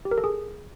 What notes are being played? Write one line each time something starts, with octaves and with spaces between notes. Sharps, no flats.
G4
A#4
A4
G#4